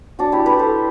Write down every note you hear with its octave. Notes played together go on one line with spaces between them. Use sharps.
D4 F#4
E4 G4
G4 B4
A4 C5